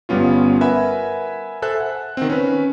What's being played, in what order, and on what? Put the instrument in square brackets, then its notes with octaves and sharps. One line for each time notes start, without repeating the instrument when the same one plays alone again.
[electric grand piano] G1 G3 B3 C#4 F4
A#4 B4 E5 F#5 G#5 B5
A4 C5 E5 G#5 F#6
F#5
D#3 C4
C#4 B4